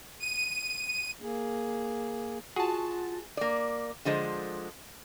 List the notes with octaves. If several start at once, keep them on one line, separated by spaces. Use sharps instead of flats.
D#7
A#3 G#4
F4 F#4 G#4 A5
A#3 D5
D3 F3 G#3 C5